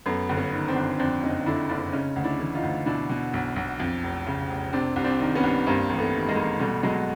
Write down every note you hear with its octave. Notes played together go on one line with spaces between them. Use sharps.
F#2 A3 B3
G1
B3 C#4
D#3
C4 D4
G1
F2 C4 D4
F#1 C#4 D#4
D3 D4 E4
F#1 D4 E4
C#3 C#4 D#4
D2
D4 E4
E3
D#4 F4
D2
B2 D4 E4
B2
B1
B1
F2
F1
C#3
F1
C3 C4 D4
C2
C4 D4
D#3
B3 C#4
C2
G2 A#3 C4
A1
A3 B3
D#3
G#3 A#3
A1
B2 G3 A3
B2 F#3 G#3